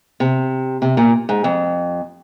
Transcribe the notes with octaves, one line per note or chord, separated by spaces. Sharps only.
C3
C3
A#2
G#2
F2